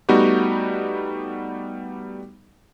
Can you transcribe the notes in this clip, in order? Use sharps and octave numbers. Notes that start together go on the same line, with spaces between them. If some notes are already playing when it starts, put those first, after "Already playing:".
G3 A3 B3 D#4 F#4 G4